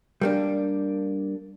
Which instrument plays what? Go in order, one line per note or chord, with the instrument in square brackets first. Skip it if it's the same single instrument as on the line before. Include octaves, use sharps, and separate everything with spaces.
[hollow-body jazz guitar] G3 A#3 D4